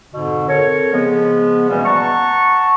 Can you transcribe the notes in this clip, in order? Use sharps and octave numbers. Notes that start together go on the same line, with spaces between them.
F2 G#2 B2 D3
C4 A4 A#4 C#5
C#3 F3 G#3 B3
B2 E3 G3 A3 A#3 C#4
F#5 A5 A#5 C#6